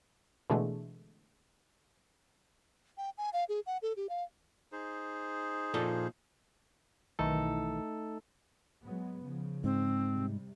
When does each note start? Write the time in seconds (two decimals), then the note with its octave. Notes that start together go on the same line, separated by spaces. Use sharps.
0.50 B2 D3 E3 G#3 A3
2.98 G5
3.18 G#5
3.33 F5
3.49 G#4
3.66 F#5
3.82 A4
3.97 G4
4.09 F5
4.72 D#4 G#4 C5
5.74 A#2 F3 A4
7.19 B1 D#3 E3 A3 D#4 A4
8.84 F#3 G#3 B3
9.24 C#3 F3
9.64 G#2 C4
10.12 C3 G3